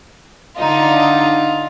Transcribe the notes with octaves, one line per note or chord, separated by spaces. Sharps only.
D3 D#4 F4